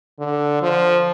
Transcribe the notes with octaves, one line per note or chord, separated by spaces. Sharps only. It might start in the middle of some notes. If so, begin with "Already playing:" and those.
D3
F3